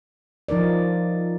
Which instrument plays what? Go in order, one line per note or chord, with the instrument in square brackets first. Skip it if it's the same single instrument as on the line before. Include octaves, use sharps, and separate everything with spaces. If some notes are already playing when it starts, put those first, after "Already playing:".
[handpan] F3 D#4 A#4 D5